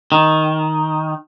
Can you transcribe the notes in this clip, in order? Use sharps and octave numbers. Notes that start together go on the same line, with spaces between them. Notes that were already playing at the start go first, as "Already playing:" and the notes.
D#3